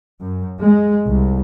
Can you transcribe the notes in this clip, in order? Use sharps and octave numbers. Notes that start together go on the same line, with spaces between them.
F#2
G#3
C2